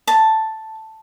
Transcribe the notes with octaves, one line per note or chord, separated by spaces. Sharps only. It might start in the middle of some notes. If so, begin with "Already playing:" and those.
A5